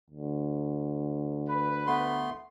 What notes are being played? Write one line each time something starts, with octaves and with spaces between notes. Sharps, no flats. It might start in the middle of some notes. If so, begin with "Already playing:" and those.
D2
B4
A3 B3 C6